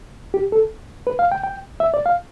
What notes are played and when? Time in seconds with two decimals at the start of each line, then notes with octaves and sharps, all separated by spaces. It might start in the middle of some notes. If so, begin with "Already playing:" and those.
0.34 G4
0.52 A4
1.07 B4
1.19 F5
1.32 G5
1.44 G5
1.80 E5
1.94 D5
2.06 F5